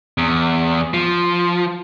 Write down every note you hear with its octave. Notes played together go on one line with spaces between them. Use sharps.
E2
F3